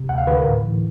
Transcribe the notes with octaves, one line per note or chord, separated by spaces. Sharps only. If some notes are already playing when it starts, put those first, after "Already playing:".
Already playing: C3
D2 F#5
F5
D3 B4
A#4
A2
E3